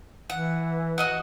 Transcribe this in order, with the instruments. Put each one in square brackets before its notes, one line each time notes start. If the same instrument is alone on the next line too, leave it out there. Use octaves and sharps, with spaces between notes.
[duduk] E3 [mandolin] F#5
[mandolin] F#4 D#5 F#5